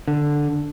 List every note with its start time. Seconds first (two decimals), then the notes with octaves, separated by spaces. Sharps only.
0.08 D3